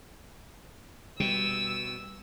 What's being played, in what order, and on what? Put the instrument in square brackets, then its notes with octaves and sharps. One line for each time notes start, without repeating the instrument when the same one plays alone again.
[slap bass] B2 [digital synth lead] G3 [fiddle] E6